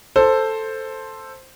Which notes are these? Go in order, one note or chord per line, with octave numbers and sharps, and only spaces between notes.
A4 C5